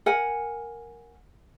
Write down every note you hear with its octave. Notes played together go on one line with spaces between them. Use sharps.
A#4 F#5 G#5